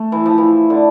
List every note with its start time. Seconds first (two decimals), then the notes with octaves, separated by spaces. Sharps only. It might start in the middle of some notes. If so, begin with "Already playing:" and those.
Already playing: A3
0.12 E3
0.26 F3
0.38 E3
0.70 D3